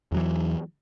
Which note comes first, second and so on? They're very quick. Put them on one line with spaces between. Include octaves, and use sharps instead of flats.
E2 F#3 E3